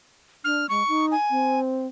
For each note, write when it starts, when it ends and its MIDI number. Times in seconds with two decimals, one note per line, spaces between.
0.44 0.67 62
0.44 0.66 89
0.69 0.82 56
0.69 1.06 85
0.88 1.13 63
1.11 1.60 80
1.30 1.86 60